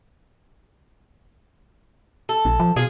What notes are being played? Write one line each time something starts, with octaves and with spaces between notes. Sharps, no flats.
A4
A#1
F3
B2 F4 G#4